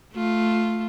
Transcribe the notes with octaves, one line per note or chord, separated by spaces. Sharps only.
A3 F4